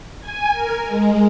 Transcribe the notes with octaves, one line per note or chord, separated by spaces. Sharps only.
G#5
A#4
G#3